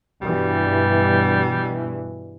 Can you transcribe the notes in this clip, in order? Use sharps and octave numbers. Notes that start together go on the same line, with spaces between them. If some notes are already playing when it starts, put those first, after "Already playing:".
G2 B2 E3 G3